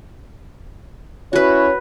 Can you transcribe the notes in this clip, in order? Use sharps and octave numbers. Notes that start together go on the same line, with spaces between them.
C#4 E4 F#4 B4 C#5